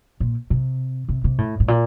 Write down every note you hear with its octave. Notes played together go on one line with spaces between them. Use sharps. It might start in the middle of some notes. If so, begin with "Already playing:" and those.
A#2
C3
C3
C3
A2
A2
A#2